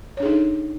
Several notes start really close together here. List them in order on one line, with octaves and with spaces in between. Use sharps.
C#5 D4 G#4 D#4 A4